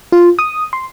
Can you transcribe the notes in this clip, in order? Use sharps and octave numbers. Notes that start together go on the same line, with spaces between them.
F4
D#6
C6